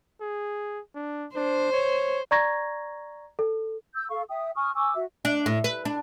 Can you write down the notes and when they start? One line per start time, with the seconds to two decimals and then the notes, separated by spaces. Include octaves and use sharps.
0.21 G#4
0.95 D4
1.35 D4 C5
1.73 C#5
2.31 D5 A#5 C#6 G#6 A#6
3.39 A4
3.95 E6 G6
4.10 A4 F5 C#6
4.29 E5 G5 D#6
4.55 G#5 C#6 D#6 F6
4.75 G#5 C#6 D6 E6
4.95 F#4 E5
5.25 D4
5.46 A2
5.64 B4
5.85 D4